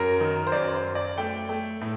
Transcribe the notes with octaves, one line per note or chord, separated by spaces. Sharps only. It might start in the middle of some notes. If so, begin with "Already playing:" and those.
Already playing: F#2 A#4
D#3
C5
F#2 D5
C5
F#2
D5
A3 G5
A3
A2